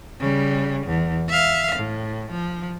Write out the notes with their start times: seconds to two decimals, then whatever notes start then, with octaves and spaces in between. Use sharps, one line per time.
0.20 C#3 G3
0.86 E2
1.29 E5 F5
1.75 A2
2.31 F3